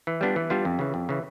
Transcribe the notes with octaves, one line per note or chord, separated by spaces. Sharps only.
E3
G3 B3 D4 F4
E3
G3 B3 D4 F4
F2
C#3 E3
F2
C#3 E3